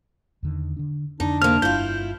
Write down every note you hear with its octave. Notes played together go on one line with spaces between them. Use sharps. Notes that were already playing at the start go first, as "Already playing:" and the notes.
E2 D3 D#3
D3 D4
F2 D3 D4 D#4
C3 A#3 F6
G1 G2 E4 F4 G6